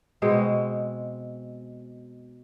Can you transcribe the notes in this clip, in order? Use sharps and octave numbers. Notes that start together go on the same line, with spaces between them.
B2 G#3 C4